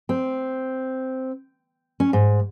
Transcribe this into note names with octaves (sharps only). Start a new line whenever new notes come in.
C4
C#4
G#2